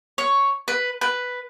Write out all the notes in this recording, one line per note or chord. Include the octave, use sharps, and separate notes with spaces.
C#5
B4
B4